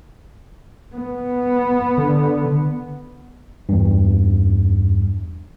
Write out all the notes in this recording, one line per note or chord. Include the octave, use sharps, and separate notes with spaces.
B3
D3
E2 G2